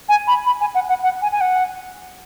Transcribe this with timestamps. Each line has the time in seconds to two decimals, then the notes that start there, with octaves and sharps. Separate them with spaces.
0.09 G#5
0.28 B5
0.46 B5
0.61 G#5
0.75 F#5
0.89 F#5
1.03 F#5
1.22 G#5
1.32 G#5
1.41 F#5